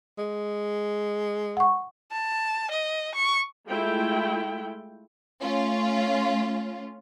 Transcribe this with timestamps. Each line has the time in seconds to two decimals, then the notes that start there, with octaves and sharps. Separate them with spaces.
0.18 G#3
1.57 F#5 C#6
2.12 A5
2.71 D#5
3.15 C#6
3.67 G#3 A3 E4 F4 G5
5.41 A3 C#4 F4